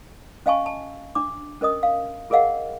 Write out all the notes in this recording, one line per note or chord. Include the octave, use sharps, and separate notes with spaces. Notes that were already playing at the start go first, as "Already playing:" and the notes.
C#4 D#5 F5 G#5 A5 C#6
A5
D4 D6
C#4 A#4 D#5 D#6
F5
F4 G#4 A#4 D#5 F5 F#5